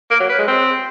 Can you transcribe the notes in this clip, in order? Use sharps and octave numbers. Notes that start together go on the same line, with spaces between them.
A#3
F#3
B4
G#3
C4